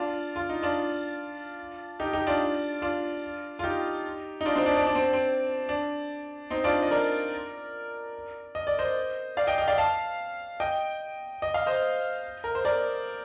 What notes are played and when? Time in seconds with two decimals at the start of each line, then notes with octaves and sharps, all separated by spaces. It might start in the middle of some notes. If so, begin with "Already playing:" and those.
Already playing: D4 F4
0.36 F4
0.49 D#4
0.62 D4 F4
2.00 D#4 G4
2.13 D#4 G4
2.27 D4 F4
2.82 D4 F4
3.59 F4
3.64 D#4 G4
4.41 D#4
4.45 D4 F4
4.55 C4 D#4
4.66 D4
4.76 D4
4.87 D4
4.95 C4
5.13 C4
5.69 D4
6.50 C4 D#4
6.64 D4 F4
6.82 D#5
6.91 A#4 D5
8.55 D#5
8.67 D5
8.79 C5 D#5
9.37 D5 F5
9.47 D#5 G5
9.58 D#5 G5
9.68 D5 F5
9.78 F5 A5
10.60 D#5 G5
11.42 D#5
11.54 F5
11.66 C5 D#5
12.44 A#4
12.55 C5
12.65 A#4 D5